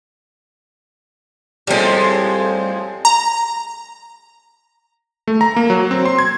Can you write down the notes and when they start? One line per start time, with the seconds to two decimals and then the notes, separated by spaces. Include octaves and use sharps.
1.67 A2 F3 G3 G#3 C4
3.05 A#5
5.28 A3
5.41 A#5
5.56 A#3
5.70 F#3
5.91 C4
6.05 C6
6.18 G#6